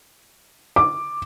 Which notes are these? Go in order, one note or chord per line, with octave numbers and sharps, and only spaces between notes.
D6